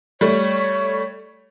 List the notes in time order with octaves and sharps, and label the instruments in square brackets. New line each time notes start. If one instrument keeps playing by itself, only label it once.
[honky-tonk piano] G3 A3 [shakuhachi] C#5